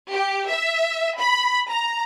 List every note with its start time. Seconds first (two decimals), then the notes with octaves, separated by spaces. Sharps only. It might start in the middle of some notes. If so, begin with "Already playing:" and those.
0.12 G4
0.50 E5
1.20 B5
1.69 A#5